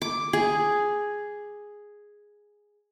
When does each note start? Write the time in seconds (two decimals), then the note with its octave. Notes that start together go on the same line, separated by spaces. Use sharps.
0.02 D6
0.33 G#4